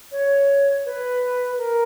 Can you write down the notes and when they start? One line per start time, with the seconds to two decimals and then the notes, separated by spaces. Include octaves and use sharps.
0.11 C#5
0.85 B4
1.57 A#4